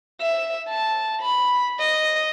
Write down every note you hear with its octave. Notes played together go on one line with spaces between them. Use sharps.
E5
A5
B5
D#5